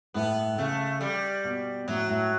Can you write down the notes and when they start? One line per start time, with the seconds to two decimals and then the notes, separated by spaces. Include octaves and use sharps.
0.14 A2 B3
0.58 C#3 A3
1.01 G3
1.44 B2
1.87 A2 F#3
2.09 A2